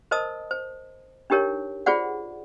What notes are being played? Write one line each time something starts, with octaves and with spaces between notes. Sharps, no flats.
A#4 C5 D#5 A5 D#6
C5
D4 D#4 G4 A#4 C#5
F4 G#4 C5 D5 F#5